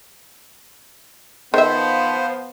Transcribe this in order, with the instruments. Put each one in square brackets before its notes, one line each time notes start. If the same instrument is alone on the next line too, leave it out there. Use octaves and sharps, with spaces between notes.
[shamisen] D#3 E5 [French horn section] F3 B3 [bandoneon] C5